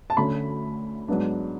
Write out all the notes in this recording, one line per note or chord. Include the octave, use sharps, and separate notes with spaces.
A5
D2 D3 A3 C#4 B5
G#2 F#3 B3 D4